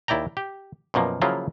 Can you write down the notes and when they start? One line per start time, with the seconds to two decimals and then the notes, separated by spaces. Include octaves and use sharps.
0.08 D#2 E4 D5 G5 A#5
0.37 G4
0.94 F#2 B2 F3 A#3
1.22 C#3 F3 F#3 A#3 E4 F4